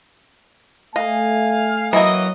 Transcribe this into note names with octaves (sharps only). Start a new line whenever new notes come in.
A3 D#5 F5 G#5
E3 F#3 A#3 D#5